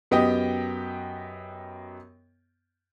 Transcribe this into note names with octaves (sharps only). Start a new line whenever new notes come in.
F#2 B3 G4 D#5 G5